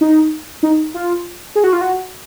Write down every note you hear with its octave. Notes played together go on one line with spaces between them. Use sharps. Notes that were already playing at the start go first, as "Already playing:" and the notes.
D#4
D#4
F4
G#4
F#4
F4
F#4